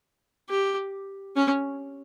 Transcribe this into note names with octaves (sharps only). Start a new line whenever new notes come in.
G4
C#4